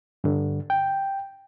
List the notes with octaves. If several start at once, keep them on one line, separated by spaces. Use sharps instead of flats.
G2 D3
G5